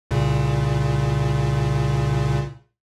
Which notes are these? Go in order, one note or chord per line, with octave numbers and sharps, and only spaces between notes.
C2 A#2 C#3